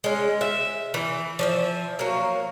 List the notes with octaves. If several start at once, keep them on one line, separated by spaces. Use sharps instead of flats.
G#3 C#4
E5
E3
F3 D5 E5
F#3 A#3